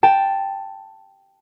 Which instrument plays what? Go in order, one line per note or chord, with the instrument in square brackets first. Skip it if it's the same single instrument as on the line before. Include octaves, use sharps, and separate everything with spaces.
[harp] G5 A5